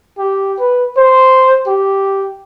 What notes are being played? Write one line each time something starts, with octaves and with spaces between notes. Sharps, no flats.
G4
B4
C5
G4